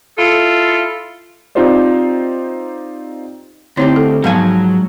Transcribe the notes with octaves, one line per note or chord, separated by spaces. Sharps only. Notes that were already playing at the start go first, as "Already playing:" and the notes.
E4 F4 A4
C4 D#4 F4 G4 C5 D5
D2 C4 D#4 E4 G4 C#5
A4
G#2 F3 F#3 B3 F5 G#5